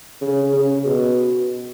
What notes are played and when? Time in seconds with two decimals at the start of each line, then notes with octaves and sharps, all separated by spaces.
0.21 C#3
0.53 C#3
0.85 B2